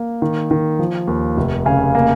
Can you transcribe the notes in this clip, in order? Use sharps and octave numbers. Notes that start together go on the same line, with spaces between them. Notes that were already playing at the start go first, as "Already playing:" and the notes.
Already playing: A#3
D#3
D#3
F3
D#2
F1
C#3 F5 G#5
A#3